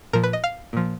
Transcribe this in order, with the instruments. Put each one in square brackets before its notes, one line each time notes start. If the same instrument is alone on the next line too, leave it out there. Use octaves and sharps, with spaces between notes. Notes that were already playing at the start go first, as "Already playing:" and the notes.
[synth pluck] A#2 F3 A#4
B4
D#5
F5
A#2 F3